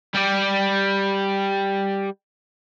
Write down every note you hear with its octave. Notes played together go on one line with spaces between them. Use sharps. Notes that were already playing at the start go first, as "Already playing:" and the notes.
G3 G4